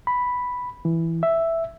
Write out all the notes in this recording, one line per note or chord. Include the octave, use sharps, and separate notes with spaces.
B5
E3
E5